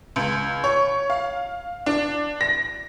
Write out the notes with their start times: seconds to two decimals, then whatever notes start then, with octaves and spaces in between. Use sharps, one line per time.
0.16 C#2
0.64 C#5
1.10 F5
1.86 D4
2.41 A#6